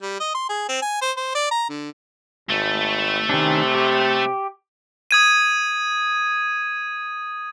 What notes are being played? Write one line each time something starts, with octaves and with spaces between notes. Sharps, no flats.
G3
D#5
C6
G#4
C4
G#5
C5
C5
D5
A#5
D3
G#1 A3
C3 D#3 C#4 D4
G4
D#6 G#6 D#7